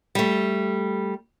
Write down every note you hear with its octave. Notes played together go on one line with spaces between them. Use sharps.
G3 A3